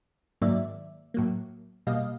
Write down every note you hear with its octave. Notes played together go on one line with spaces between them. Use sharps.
G#2 D#3 F#3 A#3 D5 E5
A2 F#3 A#3
B2 G3 A#3 D#5 F5